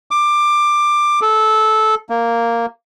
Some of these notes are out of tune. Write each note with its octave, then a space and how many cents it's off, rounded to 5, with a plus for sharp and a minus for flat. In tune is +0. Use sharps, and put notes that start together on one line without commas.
D6 +15
A4 -15
A#3 -5